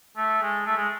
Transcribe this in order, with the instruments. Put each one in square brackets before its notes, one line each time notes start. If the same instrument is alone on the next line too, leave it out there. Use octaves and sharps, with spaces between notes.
[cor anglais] A3
G#3
A3
G#3